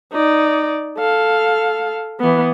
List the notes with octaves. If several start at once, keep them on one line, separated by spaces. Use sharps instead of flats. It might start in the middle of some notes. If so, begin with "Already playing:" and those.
D#4 D5
A4 F5
E3 B3